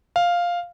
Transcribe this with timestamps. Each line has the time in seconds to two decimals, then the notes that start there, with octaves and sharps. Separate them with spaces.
0.16 F5